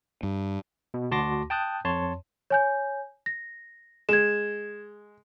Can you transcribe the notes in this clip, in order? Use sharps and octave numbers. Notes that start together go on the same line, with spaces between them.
G2
B2
D2 F#4 A5 C6 D6 A#6
G5 A5 D#6 F#6 G6
F2 C#5 A5 C6
C#5 G#5 G6
A#6
G#3 G#6 E7